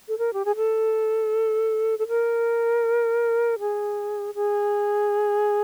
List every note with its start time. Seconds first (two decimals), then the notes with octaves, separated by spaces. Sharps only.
0.08 A4
0.18 A#4
0.33 G4
0.45 G#4
0.56 A4
1.99 A4
2.08 A#4
3.60 G#4
4.35 G#4